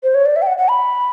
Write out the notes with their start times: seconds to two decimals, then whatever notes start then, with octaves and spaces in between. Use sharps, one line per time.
0.03 C5
0.14 C#5
0.25 D5
0.36 E5
0.42 G5
0.47 F#5
0.58 F#5
0.69 B5